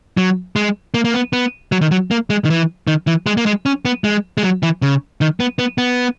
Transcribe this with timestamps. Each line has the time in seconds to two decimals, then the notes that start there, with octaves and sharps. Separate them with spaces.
0.17 F#3
0.56 G#3
0.94 A#3
1.05 A#3
1.14 B3
1.33 B3
1.72 F#3
1.81 D#3
1.91 F#3
2.11 A#3
2.30 G#3
2.45 D#3
2.50 E3
2.87 D#3
3.07 E3
3.26 G#3
3.37 A#3
3.46 G#3
3.66 C#4
3.85 B3
4.04 G#3
4.38 G#3
4.43 F#3
4.63 E3
4.82 C#3
5.21 D#3
5.40 B3
5.59 B3
5.78 B3